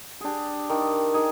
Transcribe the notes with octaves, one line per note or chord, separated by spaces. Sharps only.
D4 G4 G#4
D#3
D#3 G#4